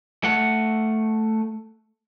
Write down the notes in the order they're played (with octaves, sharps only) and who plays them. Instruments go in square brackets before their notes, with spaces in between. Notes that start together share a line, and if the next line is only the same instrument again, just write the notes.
[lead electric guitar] A3 F#5